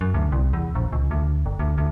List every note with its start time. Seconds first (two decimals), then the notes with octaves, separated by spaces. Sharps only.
0.01 F#2
0.14 D2
0.32 C2
0.53 E2
0.75 A#1
0.93 C#2
1.11 D2
1.46 G1
1.59 D2
1.78 D2